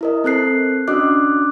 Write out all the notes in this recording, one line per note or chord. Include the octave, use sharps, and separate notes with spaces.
E4 A#4 D#5
C4 A4 F#6 C7
C#4 D4 F#4 D#5 D6 F#6